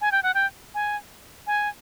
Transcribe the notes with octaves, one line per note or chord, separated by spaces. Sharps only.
G#5
G5
F#5
G5
G#5
G#5